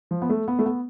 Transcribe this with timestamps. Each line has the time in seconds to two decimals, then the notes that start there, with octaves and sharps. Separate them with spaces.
0.11 F3
0.22 B3
0.30 A3
0.48 B3
0.59 A3
0.66 B3